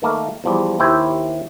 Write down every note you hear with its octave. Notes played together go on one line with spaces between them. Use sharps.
D#3 A3 A#3 A#4
E2 F3 G3
D#2 E4 G4 C5 G#5